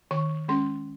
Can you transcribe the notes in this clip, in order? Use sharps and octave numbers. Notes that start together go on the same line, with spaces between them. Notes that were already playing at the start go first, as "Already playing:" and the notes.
D#3 C#6
G#3 C#4 C6